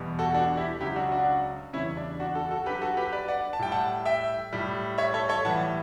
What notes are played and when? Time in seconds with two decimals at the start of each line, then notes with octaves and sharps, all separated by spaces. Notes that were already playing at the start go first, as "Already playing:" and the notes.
Already playing: E2 B2 G3
0.19 F#4 A4
0.34 D4 F#4
0.57 E4 G4
0.81 C#2 C#3 F#3 E4 G4
0.96 D4 F#4
1.12 D4 F#4
1.73 E2 C#3 G3 C#4 E4
1.97 D4
2.20 D4 F#4
2.35 F#4 A4
2.51 F#4 A4
2.66 G2 F#3 G4 B4
2.81 F#4 A4
2.97 G4 B4
3.12 B4 D5
3.28 D5 F#5
3.53 A5
3.59 A2 G3 G5
3.71 F#5 A5
4.06 E5 G5
4.53 A2 G3
4.98 C#5 E5
5.14 A4 C#5
5.29 A4 C#5
5.45 A2 E3 G3 F#5 A5